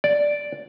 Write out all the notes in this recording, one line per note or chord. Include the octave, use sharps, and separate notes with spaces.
D5